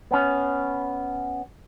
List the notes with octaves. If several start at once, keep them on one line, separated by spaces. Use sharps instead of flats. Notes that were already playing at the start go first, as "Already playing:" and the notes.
B3 C#4